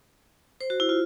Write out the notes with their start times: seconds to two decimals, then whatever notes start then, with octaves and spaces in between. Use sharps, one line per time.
0.61 C5
0.70 F#4
0.80 E4
0.89 F4